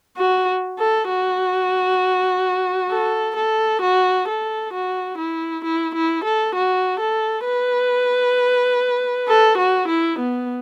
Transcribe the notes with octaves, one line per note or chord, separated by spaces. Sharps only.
F#4
A4
F#4
A4
A4
F#4
A4
F#4
E4
E4
E4
A4
F#4
A4
B4
A4
F#4
E4
B3